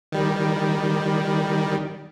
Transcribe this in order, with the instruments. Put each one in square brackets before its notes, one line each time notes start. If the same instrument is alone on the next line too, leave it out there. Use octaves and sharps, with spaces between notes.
[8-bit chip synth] D#3 G3